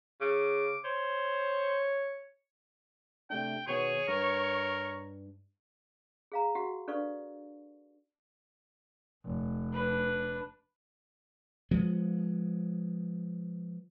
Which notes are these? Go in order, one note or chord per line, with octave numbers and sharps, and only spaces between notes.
C#3 D6
C5 C#5
C3 A3 D4 G5
B2 D#3 B3 G#4 C#5 C#6
G2 A#4
G#4 F5 A#5
F#4 G4 F#5
D4 A4 B4 D5 F5 C#6
F1
D4 B4
F3 G#3 B3